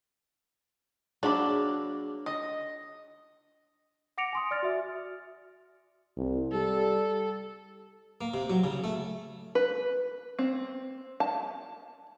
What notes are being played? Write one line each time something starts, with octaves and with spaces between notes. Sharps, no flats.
F#3 A#3 D4 G#4 B5 D6
D#5 D#6 A#6
F#5 D6 A#6 C#7 D7 F7
G#5 C6 D#6
D5 F6 A6
F#4 E5
C2
G3 A4
A#3
C3
F#3
C#3
A3
B4
C4
A5